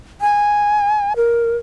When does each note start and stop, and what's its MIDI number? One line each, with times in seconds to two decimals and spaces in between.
0.21 1.13 80
1.16 1.57 70